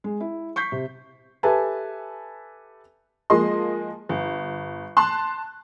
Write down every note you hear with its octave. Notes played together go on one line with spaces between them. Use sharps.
G#3
E4
C#6 G6 B6 C7
C3
G4 A4 B4 E5 G#5 A5
F3 G#3 A#3 D#5 C6
G1
A5 C6 F#6